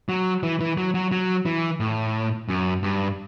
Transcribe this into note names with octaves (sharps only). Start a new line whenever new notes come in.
F#3
E3
E3
F#3
F#3
F#3
E3
A2
F#2
G2